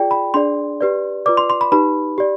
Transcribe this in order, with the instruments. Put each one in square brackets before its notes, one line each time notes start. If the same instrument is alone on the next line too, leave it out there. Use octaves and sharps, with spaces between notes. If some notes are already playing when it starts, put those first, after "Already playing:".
Already playing: [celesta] F4 G#4 D5 G5
B5
D4 G#4 D5 C6
G4 B4 D5
F4 B4 D5 D6
C6
C6
B5
D#4 G4 B4 B5
G4 D5